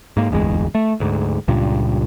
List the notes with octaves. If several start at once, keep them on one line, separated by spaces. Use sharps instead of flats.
G#2 A#3
D1 G1 E2 G#3
A3
D2 G#2
C#2 G2 A#2